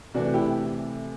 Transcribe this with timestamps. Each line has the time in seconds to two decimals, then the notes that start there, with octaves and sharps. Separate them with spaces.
0.14 C3 E3 A3 D4 F#4
0.34 E4 G4